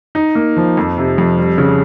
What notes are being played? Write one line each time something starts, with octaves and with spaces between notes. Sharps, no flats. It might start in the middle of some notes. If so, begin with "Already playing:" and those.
D#4
A#3
F3
F2
C3
F2
G3
C#3